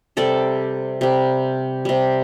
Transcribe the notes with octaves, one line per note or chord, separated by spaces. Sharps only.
C3 G3 A4 D5
C3 G3
C3 G3